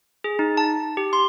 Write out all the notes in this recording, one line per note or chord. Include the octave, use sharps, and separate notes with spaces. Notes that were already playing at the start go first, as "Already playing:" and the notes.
G#4
D#4
A5
G4
C6